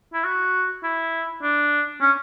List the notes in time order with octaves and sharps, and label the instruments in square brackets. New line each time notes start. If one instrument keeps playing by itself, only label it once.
[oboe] E4
F#4
E4
D4
C#4